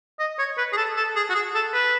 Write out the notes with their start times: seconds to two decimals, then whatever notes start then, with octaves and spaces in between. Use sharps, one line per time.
0.19 D#5
0.38 C#5
0.57 B4
0.73 G#4
0.77 A4
0.96 A4
1.16 G#4
1.29 F#4
1.35 G#4
1.55 A4
1.73 B4